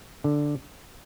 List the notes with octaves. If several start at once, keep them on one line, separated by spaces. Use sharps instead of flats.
D3